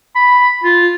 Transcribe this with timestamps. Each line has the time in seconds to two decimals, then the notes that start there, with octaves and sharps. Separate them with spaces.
0.15 B5
0.64 F4